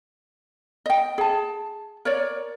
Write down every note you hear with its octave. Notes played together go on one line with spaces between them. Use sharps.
D#5 G5
G#4 A5
A#4 C#5 D5